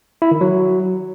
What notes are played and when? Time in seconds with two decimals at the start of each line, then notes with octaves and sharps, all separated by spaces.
0.22 E4
0.31 D#3
0.41 F#3